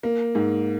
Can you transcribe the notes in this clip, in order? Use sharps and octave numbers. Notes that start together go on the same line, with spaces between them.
A#3
G#2